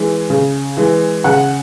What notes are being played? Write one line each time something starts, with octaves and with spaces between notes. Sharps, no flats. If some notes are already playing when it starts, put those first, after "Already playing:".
Already playing: E3 G#3
C#3
E3 G#3
C#3 F#5